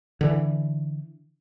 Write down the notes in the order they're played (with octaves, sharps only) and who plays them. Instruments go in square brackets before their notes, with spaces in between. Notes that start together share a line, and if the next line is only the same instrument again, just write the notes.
[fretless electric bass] D3 E3